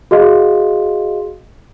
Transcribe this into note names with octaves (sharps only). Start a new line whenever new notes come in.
F#4 G#4 D#5 F5 C6